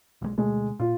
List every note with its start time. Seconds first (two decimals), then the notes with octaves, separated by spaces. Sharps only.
0.22 B1 D#3 G#3
0.38 D2 B2 G#3 A3
0.80 A#2 F4